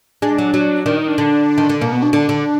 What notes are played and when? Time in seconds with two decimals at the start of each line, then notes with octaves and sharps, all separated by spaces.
0.22 G#3 D4
0.38 F#3
0.54 F#3
0.86 D#3 D4
0.97 D#4
1.08 D4
1.18 D3
1.58 D#3
1.69 D3
1.81 B2 A#3
1.92 B3
2.02 D4
2.13 D3 D4
2.29 D3